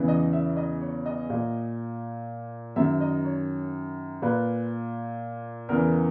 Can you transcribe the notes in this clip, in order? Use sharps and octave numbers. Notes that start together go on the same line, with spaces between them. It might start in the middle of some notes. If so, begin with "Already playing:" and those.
Already playing: E2 C#3 E3
D#5
E5
D#5
C#5
D#5
A#2
F#2 D#3 E5
D#5
C#5
A#2 B4
E2 C#3 E3 A#4